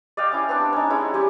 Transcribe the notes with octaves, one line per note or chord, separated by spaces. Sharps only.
D5 D#5 F5 G5
C#4 E4
B3 C4 D4
C#4 D#4
G#3 C4 C#4 E4
G3 C#4 G4